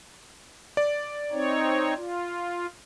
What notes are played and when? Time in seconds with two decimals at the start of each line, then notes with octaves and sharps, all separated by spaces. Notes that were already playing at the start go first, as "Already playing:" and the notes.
0.77 D5
1.32 C4 D#4 C#5
1.96 F4